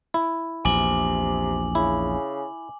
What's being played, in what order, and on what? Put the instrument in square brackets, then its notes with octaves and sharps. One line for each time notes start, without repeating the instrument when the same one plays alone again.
[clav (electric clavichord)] E4
[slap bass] A#1 E2 [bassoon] C3 [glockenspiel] G#5 D6 F#7
[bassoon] C#3 [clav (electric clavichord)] E4